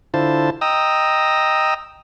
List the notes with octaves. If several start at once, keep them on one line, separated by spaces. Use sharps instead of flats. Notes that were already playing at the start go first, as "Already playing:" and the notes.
D3 E4 F4 C5 A5
D#5 G5 A#5 D#6 E6